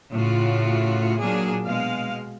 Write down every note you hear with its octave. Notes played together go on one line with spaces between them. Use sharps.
A2 C#3 F4 F#4
A#2 F#3 A#3 D4 G#4
B2 G#3 F5